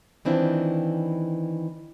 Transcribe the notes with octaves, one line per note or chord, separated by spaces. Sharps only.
D#3 E3 C4 D4 E4 F4